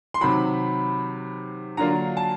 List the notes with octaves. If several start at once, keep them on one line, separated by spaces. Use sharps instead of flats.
C6
C3 D#3 F#3 B5
D3 F#3 A#3 D4 F4 A#5
A5